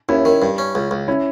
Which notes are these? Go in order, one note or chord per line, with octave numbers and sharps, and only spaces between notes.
D#2 C#4 E4
D#3
G2
C#4
C#2
C#2
C#4 E4